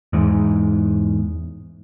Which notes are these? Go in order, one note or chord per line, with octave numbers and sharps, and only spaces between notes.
E2 G#2